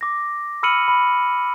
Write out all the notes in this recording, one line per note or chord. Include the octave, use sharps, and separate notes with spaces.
D6 A#6
B5 E6 F6 C#7 D#7 F#7
B5